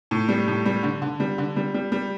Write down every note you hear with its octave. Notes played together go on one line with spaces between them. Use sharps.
A2
G3
A2
G3
D3
D3
G3
D3
G3
G3
G3